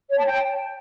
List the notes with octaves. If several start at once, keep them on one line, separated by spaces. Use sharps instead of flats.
C#5
A5
G5